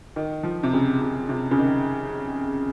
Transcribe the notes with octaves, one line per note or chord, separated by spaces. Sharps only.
D#3
F3
C3
C#3
C3
C3
C#3
D#3